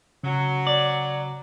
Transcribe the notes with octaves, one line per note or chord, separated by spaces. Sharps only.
C#3 F#3
D5